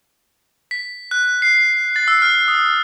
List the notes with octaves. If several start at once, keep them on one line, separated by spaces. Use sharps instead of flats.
B6
F#6
C7
A6
E6
F6
D#6